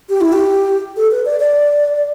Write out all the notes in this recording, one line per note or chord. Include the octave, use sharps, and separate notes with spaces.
G4
E4
G4
A4
B4
D5
D5